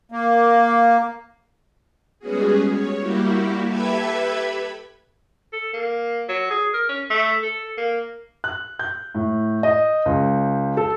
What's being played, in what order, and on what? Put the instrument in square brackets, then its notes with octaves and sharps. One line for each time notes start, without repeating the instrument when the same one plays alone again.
[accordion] A#3
[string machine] G3 G#3 B3 C#4 F#4 G#4
C#5
G3 A#3 E4 F#4 G4
G4 A4 B4 E5 B5 G#6
[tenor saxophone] A4
A#3
F#3
G#4
A#4
C#4
A3
A4
A#3
[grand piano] F#6
G6
A2
D#5
C#2
A4